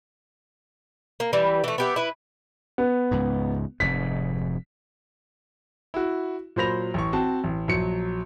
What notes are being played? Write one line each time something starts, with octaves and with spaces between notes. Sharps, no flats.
A#3
E3 G3
E3 A3
B3 G4 E5
E4 B4
B3
C#2 G#2
F1 G#2 B6
E4 F#4
A#2 F#3 C5 B5 A#6 F7
A1 C#6
C4 F#4 A5
A1
A#1 F#3 C#7